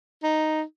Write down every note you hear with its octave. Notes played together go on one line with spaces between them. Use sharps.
D#4